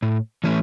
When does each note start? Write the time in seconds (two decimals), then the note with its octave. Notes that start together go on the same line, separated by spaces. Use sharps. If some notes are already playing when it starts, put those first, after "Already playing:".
0.02 A2
0.44 E3 A3 C#4